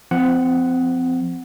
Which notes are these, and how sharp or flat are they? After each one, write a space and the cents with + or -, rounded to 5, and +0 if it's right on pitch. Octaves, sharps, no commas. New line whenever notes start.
F3 -15 C4 -30 F#5 +0